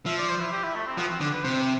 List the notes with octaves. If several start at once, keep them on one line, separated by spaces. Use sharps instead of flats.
F3 E5
D5
C5
E4
G4
E4
A3
C4
F3 B3
C4
D3 D4
B4
C3 C5